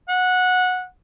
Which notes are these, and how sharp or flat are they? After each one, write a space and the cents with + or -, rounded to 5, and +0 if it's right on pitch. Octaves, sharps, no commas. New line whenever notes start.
F#5 -15